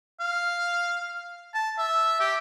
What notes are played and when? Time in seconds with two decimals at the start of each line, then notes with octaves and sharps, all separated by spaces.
0.20 F5
1.54 A5
1.78 E5
2.20 G4